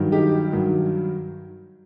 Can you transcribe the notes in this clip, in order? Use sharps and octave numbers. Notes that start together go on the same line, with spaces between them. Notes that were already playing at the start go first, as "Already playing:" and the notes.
Already playing: G2 D#3 F#3
D#4 G4
G2 D#3 F#3